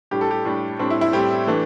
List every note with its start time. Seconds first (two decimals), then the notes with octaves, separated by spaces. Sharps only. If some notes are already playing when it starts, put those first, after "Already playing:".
0.11 A2 G3 D4 G4
0.21 A4
0.31 G4
0.45 A2 G3 D4
0.79 A2 G3 C4 D4
0.90 E4
1.01 E4
1.12 A2 G3 C4 G4
1.47 E3 A3 D4